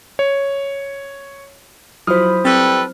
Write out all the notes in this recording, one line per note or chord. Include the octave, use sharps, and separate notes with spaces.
C#5
F3 F#3 E4 C5 B5 D#6 F6
G3 C4 A4 B4